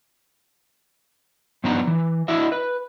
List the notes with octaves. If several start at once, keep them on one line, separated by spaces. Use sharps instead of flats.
G2 F3 B3 D4 D#4 A#5
E3
D4 E4 F#4 D#5 E5
B4